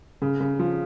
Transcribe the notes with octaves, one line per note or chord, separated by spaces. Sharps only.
C#3
C#3
F3